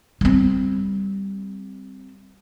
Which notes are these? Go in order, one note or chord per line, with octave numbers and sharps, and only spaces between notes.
G3 C4